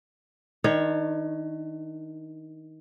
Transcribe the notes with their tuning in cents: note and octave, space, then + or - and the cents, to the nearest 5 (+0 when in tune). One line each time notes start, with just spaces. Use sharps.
D#3 +20 D4 +40 C#5 +0